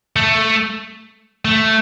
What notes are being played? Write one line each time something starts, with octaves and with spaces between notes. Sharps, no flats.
A3
A3